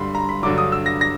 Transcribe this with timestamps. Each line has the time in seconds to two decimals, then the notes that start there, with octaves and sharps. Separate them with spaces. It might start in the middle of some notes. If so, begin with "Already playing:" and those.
Already playing: G2 D3 G3 B5 C6
0.15 A#5
0.29 B5
0.43 G2 D3 F#3 D6
0.58 D#6
0.72 E6
0.86 A#6
1.01 A#6